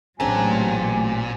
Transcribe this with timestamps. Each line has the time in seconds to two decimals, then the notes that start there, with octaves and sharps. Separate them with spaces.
0.20 A1 A#2 C#3 F#3 C4 D4 G#5